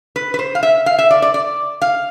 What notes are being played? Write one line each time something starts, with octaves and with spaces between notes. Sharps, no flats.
B4
B4
C5
F5
E5
F5
E5
D5
D5
D5
F5